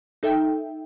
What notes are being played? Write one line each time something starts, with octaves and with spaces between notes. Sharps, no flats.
D#4 A4 E5 G5